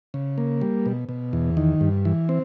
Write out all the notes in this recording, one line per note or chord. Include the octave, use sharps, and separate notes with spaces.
C#3
A#3
G3
B2
B2
E2
D#3
G2
E3
C4